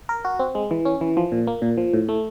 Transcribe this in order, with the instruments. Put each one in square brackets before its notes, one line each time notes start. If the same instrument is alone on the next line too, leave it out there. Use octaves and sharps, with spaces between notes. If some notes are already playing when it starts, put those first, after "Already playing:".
[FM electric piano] A#4
F#4
C4
G#3
E3
C#4
E3
F3
A#2
A#3
A#2
F3
A2
A3